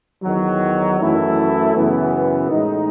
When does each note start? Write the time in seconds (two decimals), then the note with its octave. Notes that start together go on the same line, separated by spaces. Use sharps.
0.23 E2 D#3 F#3
1.00 F#2 E3 A3 E4
1.75 F#2 C#3 E3 B3
2.51 A2 G#3 D#4